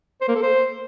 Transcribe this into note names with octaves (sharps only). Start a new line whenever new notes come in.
C5
A#3
A4
C5